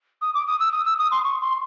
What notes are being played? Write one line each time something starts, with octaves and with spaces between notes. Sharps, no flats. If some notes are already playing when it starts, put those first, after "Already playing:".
D#6
D6
D#6
E6
D#6
E6
D#6
C6
C#6
C6